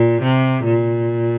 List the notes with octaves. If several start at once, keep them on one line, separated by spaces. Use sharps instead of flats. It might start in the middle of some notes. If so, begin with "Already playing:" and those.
Already playing: A#2
C3
A#2